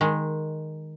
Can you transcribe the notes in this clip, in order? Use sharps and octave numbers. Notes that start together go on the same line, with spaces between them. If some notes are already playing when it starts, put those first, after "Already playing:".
D#3 G#3